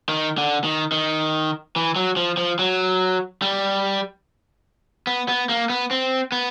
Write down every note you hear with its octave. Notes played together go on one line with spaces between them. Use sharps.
D#3
D3
D#3
D#3
E3
F#3
F3
F3
F#3
G3
B3
B3
A#3
B3
C4
B3